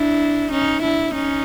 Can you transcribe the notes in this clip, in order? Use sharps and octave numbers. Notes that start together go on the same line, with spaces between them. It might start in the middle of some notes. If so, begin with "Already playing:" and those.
Already playing: D4 E4
C#4 D#4
D4 E4
C#4 D#4